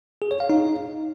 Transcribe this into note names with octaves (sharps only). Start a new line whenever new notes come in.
G#4
C#5
F5
D#4